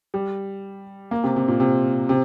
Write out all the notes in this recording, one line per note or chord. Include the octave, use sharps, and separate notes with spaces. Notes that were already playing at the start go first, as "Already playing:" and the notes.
G3
A#3
C3
C3
A#2
C3
C3